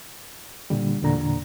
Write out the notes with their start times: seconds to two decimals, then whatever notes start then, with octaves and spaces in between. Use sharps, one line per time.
0.70 A#2 D3 G3
1.02 E2 A#2 D3 A#5